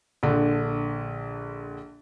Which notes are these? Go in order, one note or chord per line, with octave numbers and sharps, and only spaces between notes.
A#1 D3